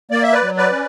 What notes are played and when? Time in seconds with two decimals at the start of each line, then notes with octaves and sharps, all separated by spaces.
0.11 A#3 D5
0.23 E5
0.33 B4 D5
0.43 F#3
0.57 B4 D5
0.73 C#4